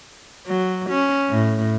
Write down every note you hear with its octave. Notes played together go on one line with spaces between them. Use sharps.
F#3
C#4
A2